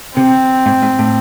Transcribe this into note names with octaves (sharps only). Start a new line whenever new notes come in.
C3 C4
G#2
G#2
A2